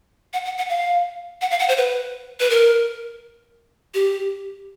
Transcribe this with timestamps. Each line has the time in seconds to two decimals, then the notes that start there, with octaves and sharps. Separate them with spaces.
0.33 F#5
0.45 F#5
0.57 F#5
0.69 F5
1.41 F#5
1.51 F5
1.59 F#5
1.68 C5
1.78 B4
2.40 B4
2.50 A#4
3.94 G4